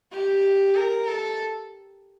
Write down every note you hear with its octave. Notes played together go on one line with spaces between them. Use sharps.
G4
A#4
A4